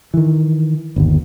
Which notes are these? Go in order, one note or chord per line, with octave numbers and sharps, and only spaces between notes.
D#3 E3
G1 D#2